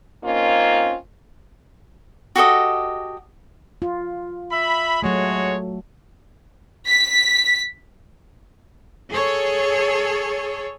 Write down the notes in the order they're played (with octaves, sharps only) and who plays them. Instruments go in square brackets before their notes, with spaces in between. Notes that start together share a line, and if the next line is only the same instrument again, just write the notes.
[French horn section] A#3 C4 C#4 D#4 F4
[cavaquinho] F#4 G4 A4 D#5
[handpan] F4
[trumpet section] E5 B5
[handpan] F#3 A3 [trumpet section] G#3 F#4 C#5
[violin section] B6
[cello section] G#4 A4 C#5